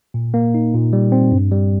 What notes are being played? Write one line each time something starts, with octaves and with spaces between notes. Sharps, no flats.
A#2
A#3
D#4
A#2
G3
C4
G2
G3